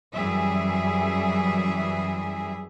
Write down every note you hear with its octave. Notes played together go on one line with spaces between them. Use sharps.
F#2 E3 G3 G#4 E5